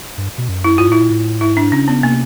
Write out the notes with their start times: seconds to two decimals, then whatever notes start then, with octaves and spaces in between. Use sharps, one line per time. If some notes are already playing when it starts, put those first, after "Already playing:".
0.18 G2
0.38 B2
0.49 F#2
0.64 E4
0.78 G2 F4
0.89 A2 E4
1.01 A#2
1.10 A2
1.41 G#2 E4
1.57 D4
1.72 C#3 C#4
1.88 B3
2.02 C3 A#3